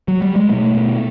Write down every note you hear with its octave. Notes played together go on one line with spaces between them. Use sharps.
F#3
G3
G#3
B2 A3
B2